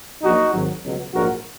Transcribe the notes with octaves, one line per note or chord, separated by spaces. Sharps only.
A#1 A#2 F#3 D#4 F#4
G#1 G#2 D#3 F#3
C#2 B2 F#3
A#1 G#2 F#3 F#4 A#4